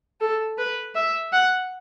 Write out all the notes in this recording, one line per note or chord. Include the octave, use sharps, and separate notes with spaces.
A4
B4
E5
F#5